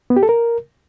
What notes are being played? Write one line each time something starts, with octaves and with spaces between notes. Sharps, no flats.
B3
G4
A4
A#4